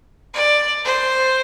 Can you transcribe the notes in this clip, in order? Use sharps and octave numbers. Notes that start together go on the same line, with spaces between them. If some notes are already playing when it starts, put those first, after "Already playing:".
D5
C5